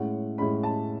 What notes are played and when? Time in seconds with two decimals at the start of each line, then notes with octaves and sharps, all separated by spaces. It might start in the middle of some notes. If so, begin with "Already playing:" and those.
Already playing: A2 G#3 C#4 F#5
0.38 A2 G#3 C#4 B5
0.63 A5